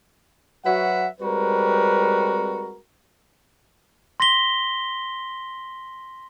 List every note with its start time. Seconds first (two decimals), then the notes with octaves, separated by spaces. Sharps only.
0.65 F#3 F#4 B4 E5 F#5
1.21 G3 G#3 C4 F#4 A#4 B4
4.20 C6 A#6 B6 G7